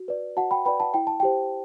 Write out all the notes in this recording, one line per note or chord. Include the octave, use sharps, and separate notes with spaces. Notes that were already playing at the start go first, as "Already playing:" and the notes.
Already playing: F#4
B4 D5
F#4 F#5 A5
G5 B5
B4 D5 G5 B5
F#5 A5
E4 G5
A5
G4 C5 G5